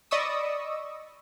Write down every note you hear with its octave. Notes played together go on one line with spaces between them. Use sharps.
D5 D#5 B5 C#6 D#6 E6